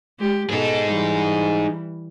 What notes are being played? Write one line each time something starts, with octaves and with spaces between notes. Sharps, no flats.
G#3 G4
B2 D#4 G#4 A4
E3 G3